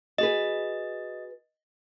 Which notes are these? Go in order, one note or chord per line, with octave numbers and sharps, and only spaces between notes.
F#4 G#4 B4 D#5